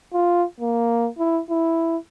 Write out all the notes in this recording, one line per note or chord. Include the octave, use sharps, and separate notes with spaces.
F4
A#3
E4
E4